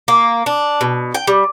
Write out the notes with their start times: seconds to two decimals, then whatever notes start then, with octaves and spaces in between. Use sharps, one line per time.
0.08 A#3
0.46 D4
0.81 B2
1.15 G5
1.27 G3